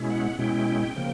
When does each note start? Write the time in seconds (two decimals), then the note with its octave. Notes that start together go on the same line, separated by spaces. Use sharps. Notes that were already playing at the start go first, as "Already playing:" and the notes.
Already playing: B2 G#3 C#4 E4
0.10 F#5
0.38 B2 G#3 C#4 E4 G5
0.96 C#3 F3 A#3